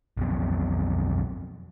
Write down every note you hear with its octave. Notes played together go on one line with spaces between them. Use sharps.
B1 F2 B2